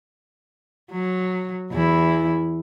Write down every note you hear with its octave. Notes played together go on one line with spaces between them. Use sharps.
F#3
E2 E4